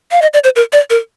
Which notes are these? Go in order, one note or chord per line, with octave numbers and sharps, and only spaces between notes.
F5
D#5
D5
C5
A#4
D5
A#4